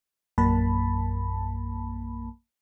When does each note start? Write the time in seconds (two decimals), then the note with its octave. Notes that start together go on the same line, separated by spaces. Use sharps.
0.38 A#1 F#2 A#3 A5 B5